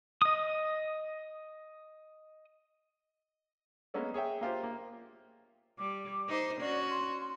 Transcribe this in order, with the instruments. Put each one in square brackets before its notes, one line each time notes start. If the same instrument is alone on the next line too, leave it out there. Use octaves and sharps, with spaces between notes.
[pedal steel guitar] D#5 D#6
[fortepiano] G#3 A#3 B3 C#4 A4
G#4 C#5 E5 G5
A#3 F4 G4 C5
A#3
[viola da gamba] G3 [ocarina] D6
[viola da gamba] D#4 C5
[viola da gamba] C#4 F#4 [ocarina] D5
[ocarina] C6